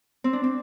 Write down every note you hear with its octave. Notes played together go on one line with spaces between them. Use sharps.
C4
D4
C4